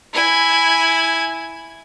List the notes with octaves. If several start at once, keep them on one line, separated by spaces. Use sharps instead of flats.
E4 G#5